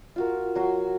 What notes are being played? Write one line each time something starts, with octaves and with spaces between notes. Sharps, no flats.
F4 F#4 A#4
F#3 F#4 C6